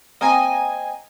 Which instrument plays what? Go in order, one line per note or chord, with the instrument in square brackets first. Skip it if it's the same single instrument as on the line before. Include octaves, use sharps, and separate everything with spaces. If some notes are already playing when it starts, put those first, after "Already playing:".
[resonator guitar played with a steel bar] A#3 C4 G5 [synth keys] D#5 G#5